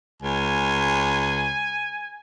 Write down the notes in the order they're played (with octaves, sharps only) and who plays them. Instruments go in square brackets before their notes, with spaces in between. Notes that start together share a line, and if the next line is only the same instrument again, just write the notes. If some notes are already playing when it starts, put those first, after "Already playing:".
[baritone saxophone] C#2 [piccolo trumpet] G#5